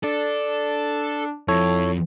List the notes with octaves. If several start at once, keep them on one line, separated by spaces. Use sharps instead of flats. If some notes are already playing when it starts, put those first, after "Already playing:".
D4 A4
F2 E4 A4 C#5